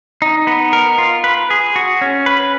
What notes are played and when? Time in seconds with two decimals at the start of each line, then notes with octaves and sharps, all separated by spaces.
0.22 D#4
0.47 B3
0.73 A#4
0.98 F4
1.24 B4
1.50 G#4
1.76 F#4
2.01 C#4
2.26 B4